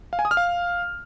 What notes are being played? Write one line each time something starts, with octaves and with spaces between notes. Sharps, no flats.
F5
G#5
D#6
F6
F5